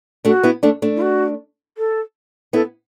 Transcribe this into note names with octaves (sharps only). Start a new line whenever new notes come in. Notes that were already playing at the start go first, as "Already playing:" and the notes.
A3 D4 F#4
B3 E4
A3 D4
A3 D4
E4
F#4
A4
B3 E4 A4